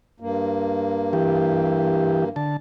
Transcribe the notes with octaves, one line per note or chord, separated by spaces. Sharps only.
G2 A#3
E3 G4
D3 A5